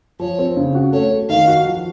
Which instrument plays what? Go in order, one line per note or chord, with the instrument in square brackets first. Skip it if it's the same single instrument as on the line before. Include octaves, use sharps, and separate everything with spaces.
[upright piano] F3 [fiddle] C#5
[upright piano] C4
C#3
F#4
[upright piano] A3 [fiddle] C#5
[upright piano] A3
[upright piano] D#3 [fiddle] F5
[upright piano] F#4
F3